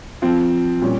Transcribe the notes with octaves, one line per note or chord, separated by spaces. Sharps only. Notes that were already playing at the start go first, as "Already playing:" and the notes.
F3 C4 F4
A#2 G3 C#4 G4